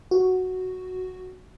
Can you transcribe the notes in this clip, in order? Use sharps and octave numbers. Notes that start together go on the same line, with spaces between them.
F#4